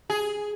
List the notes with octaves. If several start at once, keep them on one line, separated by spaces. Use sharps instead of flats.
G#4